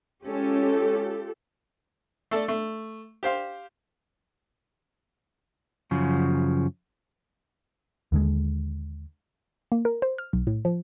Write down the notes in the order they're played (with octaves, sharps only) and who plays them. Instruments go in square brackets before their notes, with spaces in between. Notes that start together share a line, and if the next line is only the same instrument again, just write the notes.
[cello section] G#3 C#4 [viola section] F4 G4 A4
[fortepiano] A3 A4 D5
A3
G4 C5 F5
[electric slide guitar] F#2 C#3 F3
[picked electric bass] D#2 D3 G#3
[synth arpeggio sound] A#3
A#4
C5
F6
B1
A2
F3